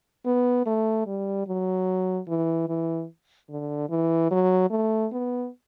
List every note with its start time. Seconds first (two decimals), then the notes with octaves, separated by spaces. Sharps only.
0.26 B3
0.66 A3
1.07 G3
1.47 F#3
2.28 E3
2.68 E3
3.50 D3
3.90 E3
4.31 F#3
4.71 A3
5.12 B3